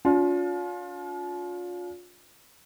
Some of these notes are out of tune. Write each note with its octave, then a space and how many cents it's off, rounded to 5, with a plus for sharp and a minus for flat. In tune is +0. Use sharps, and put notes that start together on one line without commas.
D4 -45 F4 +30